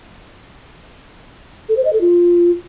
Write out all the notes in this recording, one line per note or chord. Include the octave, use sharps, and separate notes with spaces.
A4
C5
D#5
A4
F4